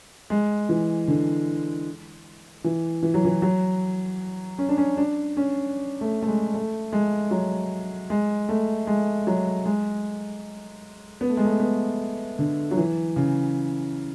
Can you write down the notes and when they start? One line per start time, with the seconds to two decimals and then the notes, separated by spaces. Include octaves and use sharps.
0.30 G#3
0.69 E3
1.08 D3
2.64 E3
3.03 E3
3.14 F#3
3.25 E3
3.42 F#3
4.58 C#4
4.69 D4
4.77 C#4
4.97 D4
5.37 C#4
6.01 A3
6.22 A3
6.27 G#3
6.54 A3
6.93 G#3
7.31 F#3
8.10 G#3
8.49 A3
8.87 G#3
9.27 F#3
9.66 G#3
11.21 B3
11.30 A3
11.37 G#3
11.45 A3
11.60 B3
12.39 D3
12.71 F#3
12.77 E3
13.16 C#3